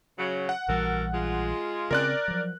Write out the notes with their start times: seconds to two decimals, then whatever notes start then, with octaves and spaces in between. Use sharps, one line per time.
0.18 C#3 F#3
0.49 F#5
0.68 A#1 E3 G3 F#4 A4 A#4
1.13 G#3 F4
1.91 C#3 C4 C#4 A#4 D5 F#6
2.28 F3 F#3